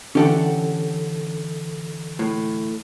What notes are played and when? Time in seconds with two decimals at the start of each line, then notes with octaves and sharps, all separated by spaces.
0.15 D3 E3 C#4 G4 A4 F#5
2.19 A2